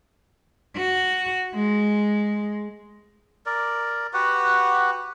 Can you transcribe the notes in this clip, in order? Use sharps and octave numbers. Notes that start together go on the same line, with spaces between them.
F#4
G#3
A#4 D5
F#4 G4 B4 F#5